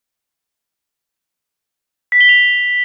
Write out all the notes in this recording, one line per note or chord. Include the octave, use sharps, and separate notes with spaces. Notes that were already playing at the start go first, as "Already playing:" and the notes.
B6
G7
F7